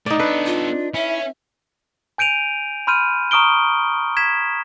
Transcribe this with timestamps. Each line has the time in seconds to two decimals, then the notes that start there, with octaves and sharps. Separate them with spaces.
0.06 A2 D#4 D5
0.20 B3 D4 A4 B4
0.46 F4
0.94 C#4 E4 E5
2.18 G#5 G6 D7 D#7 F7
2.87 B5 C6 F6 G6 D#7
3.31 A#5 C#6 D#6 F6 D7 G7
4.17 G#6 B6 E7